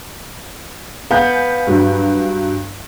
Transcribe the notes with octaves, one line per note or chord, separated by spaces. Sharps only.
B3 F5 G#5 G6
G2 F#3